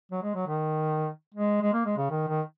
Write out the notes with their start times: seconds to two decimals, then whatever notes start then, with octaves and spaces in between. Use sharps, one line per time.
0.12 F#3
0.23 G#3
0.35 F#3
0.47 D#3
1.34 G#3
1.61 G#3
1.73 A#3
1.85 G#3
1.97 C#3
2.10 D#3
2.28 D#3